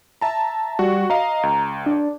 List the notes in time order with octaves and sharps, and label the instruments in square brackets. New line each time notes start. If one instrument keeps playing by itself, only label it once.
[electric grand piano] E5 A5 A#5
[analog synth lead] G3 [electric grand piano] F#4
[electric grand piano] D#5 F5 [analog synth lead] A#5
[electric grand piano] C#2
[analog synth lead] D4